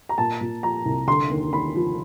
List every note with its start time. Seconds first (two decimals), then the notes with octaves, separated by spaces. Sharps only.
0.09 A#5
0.18 A#2 A5
0.41 A#2
0.63 F3 A#5
0.86 C2
1.07 D3 C6
1.30 D#2
1.52 D#2 B5
1.75 F3